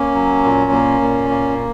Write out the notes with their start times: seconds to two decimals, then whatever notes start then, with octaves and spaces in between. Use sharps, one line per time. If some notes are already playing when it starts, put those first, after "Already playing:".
Already playing: A#3 C#4
0.14 F#3
0.43 A#2
0.72 A#3
1.01 A#2
1.30 A#3